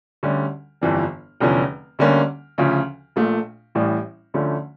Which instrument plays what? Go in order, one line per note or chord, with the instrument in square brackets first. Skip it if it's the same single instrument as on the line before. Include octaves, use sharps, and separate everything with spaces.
[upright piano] D2 D3 G3 C#4
G1 F2 E3 G3
F1 E2 D3 F3 C#4
D2 D3 G3 A#3 C#4
D2 C#3 F3 C#4
A#1 A#2 A3
A1 A2 E3 G3
D2 D3 F3 A3 C#4